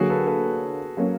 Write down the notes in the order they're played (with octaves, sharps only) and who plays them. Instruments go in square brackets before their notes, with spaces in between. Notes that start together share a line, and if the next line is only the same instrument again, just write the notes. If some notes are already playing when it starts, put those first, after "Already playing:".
Already playing: [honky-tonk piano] D3 F#3 A#3 [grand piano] F#4 G#4
[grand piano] A4 B4
A4 B4
[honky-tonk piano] F#3 A#3 C#4